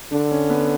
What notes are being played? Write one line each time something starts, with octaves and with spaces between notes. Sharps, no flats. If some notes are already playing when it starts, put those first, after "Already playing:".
D3 D4
C#4
B3